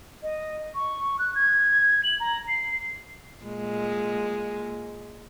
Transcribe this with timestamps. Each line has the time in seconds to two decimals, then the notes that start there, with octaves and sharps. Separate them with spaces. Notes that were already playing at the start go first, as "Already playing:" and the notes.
0.23 D#5
0.75 C#6
1.19 F#6
1.35 G#6
2.04 F#7
2.20 A#5
2.48 C7
3.44 A#2 G#3